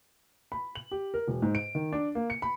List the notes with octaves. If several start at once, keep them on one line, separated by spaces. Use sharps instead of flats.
B5
F#7
G4
A#4
E1
G#2
D7
D#3
D4
A#3
C#7
B5